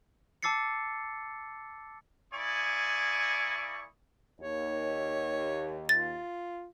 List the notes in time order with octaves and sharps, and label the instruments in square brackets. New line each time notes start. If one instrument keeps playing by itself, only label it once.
[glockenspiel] A5 D6 E6 A6 C7 C#7
[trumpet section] A#3 E4 D5 G#5 C#6 D#6
[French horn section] D#2 [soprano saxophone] C#5
[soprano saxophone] F4 [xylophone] A6